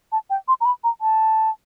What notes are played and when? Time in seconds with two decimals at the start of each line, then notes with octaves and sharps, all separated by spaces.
0.12 A5
0.30 G5
0.48 C6
0.61 A#5
0.65 B5
0.84 A#5
1.01 A5